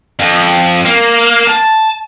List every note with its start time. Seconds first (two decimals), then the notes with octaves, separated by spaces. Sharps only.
0.20 F2
0.85 A#3
1.47 A5